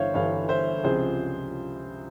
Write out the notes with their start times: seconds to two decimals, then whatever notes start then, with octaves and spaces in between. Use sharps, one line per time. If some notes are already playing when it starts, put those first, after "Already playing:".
Already playing: G1 G2 E3 C5 C#5 E5 F5
0.14 G1 G2 E3 C#5 F5
0.49 C5 E5
0.84 C#2 C3 F3 G#4 C5